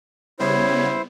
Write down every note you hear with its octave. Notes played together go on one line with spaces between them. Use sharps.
C#3 G3 B3 E4 C5 C#5